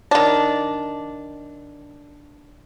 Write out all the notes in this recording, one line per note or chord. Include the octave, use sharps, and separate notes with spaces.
D#3 D4